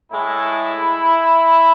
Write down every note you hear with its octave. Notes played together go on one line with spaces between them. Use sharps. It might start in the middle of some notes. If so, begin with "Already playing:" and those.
A2 G#3 E4